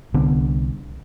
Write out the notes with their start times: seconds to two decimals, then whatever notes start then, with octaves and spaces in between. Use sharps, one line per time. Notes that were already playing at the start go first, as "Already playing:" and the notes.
0.14 C2 D3 B3